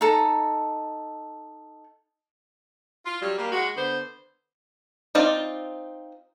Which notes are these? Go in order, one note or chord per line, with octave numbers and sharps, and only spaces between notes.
D#4 A4 A#5
F4
F#3 G3
G3 A#3
G#3 F#4
D3 B3 C5
C4 D#4 F4 D5